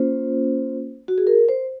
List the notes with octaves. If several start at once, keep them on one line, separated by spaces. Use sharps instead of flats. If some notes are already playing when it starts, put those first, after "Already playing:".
Already playing: A#3 C#4 F4 C5
F#4
G#4
A#4
C5